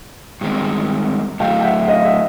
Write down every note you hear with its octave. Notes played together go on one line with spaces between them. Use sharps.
G2 D#3 G#3 C4
A2 F#3 A3 F5 G5
G5
E5 F#5
E5
D#5 F5
E5 F#5